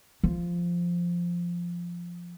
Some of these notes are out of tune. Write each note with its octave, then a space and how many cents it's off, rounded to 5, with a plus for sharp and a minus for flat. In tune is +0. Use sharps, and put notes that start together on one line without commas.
F3 -5